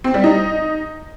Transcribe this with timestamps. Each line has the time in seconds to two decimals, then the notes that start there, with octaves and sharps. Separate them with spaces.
0.04 C4
0.14 G3
0.24 D#4